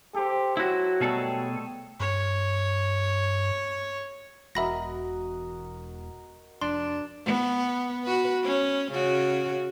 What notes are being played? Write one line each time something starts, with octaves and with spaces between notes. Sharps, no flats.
G4 A4 C5
F#3 E4 F#4
B2 G3 A3 G#4 A4 G5
G2 C#5
E1 F#4 A#4 D#5 E5 B5 A#6
F1 D4 C6
B3
F#4 B4
C#4
C#3 F#4